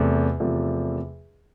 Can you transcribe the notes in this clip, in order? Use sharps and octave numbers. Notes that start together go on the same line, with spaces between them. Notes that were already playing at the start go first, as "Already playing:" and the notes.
Already playing: E2 C3 A3
E2 C3 F3 A3